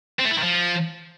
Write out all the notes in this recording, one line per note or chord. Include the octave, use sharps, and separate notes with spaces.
C4
A3
E4
D#3
F3